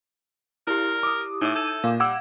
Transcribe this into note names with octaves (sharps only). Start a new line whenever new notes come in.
E4 G4 A#4
D6 D#6
A2 D#4 E5
A4 G6 G#6 D#7
A#2 F5 D6
G3 F#5 D6 E6 G#6